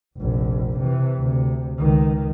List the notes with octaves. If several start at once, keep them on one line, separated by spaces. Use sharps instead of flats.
F1 A#1
C3 E3
D2 C3
C#2 D#3